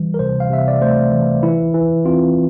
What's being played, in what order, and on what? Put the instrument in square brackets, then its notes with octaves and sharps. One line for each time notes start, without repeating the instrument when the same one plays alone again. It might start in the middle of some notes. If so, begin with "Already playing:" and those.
Already playing: [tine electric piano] E3 G3
A#4
C3 C5
F5
C3 E5
D5
A3 C5
E3
E3 E4
E3
C4 F4